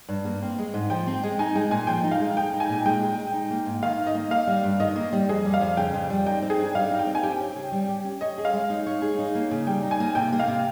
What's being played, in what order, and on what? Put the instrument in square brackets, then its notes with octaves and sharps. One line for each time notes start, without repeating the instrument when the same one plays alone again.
[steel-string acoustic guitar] G2
A#3
C4
G#3
G#2
[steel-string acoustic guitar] F3 [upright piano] G5
[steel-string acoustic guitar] C4
G#3
[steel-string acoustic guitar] D#4 [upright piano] G#5
[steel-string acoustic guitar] G#3 [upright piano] G5
[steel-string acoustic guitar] A#2 [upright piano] G#5
[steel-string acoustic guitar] F3 [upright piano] G5
[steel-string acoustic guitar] D#4
[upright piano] F5
[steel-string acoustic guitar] G#3
[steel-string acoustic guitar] G#4 [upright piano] G5
[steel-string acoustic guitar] D#4
[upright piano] G#5
[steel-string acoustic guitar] A#2
[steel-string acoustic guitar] G#3 [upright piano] G5
[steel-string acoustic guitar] G#4
D#4
D#4
A#3
G#2
[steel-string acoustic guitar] D#3 [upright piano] F5
[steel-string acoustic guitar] D#4
[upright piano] D#5
[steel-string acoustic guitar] A#3
[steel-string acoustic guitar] A#3 [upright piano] F5
[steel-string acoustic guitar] G3
G2
[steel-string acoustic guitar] D#3 [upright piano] D#5
[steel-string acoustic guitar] A#3
G3
[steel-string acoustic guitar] F2 [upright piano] G#4
[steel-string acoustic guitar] G3
[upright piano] F5
[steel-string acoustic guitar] F2
[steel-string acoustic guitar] C#3 [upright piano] G5
[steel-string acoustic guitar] F2
G3
[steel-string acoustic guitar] D#4 [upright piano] G5
[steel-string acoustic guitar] C4
[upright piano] G#4
[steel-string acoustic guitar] G2
[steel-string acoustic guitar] G3 [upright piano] F5
[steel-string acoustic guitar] D#4
[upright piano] G5
[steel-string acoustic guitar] C4
[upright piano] G#5
[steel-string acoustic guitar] G4 [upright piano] G5
[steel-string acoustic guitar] C#4
C#3
G3
G4
C#4
[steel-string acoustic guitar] C#5 [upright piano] D#5
[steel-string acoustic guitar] G#4
[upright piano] F5
[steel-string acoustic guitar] G#3
D#4
C#5
G#4
D#4
A#3
C#3
[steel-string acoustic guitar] G3 [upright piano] G5
[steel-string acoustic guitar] D#4
[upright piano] G#5
[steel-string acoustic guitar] A#3
[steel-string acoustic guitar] C3 [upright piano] G5
[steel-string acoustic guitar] A#3
[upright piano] F5
[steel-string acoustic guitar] C3